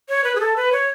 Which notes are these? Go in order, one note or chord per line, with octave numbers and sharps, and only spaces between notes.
C#5
B4
G#4
A4
B4
C#5